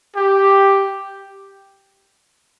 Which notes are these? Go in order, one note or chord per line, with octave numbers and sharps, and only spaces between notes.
G4